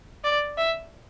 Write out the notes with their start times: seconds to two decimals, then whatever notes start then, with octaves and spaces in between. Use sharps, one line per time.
0.24 D5
0.58 E5